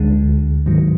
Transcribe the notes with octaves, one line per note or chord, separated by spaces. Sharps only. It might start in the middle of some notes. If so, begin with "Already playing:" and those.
Already playing: D2 D3 G#3
G#2 D#3 F#3